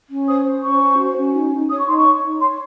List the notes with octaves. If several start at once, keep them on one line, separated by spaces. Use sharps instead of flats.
C#4
C5 D#6
C5
C#4 C#6
C5
F#4
C#4
D#4
D#4
C#5 D#6
C#6
D#4 C6
C#6
C#5
D#4
C#5 C6